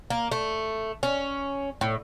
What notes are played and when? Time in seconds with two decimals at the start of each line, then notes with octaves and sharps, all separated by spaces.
0.10 A#3
0.32 A3
1.03 C#4
1.81 A2